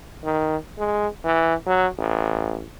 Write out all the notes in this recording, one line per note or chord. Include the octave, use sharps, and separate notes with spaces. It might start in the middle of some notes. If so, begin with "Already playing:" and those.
D#3
G#3
E3
F#3
A1